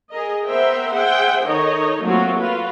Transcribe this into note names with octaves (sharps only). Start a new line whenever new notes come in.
G#4 A#4 D#5
B3 A#4 C5 E5 G5
G#4 C5 E5 F#5 G5
D#3 D#4 A4 C#5 D#5
F#3 A3 A#3 C4 F4 F#4
F4 F#4 B4